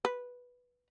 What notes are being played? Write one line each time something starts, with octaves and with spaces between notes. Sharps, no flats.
B4